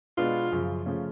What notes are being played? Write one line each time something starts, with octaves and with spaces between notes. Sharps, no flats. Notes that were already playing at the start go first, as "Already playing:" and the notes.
B2 G#3 B3 D4 F4
F#2 C#3 F3
C#3 F3 A3 C#4